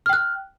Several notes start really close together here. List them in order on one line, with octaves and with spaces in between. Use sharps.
F6 G5 F#6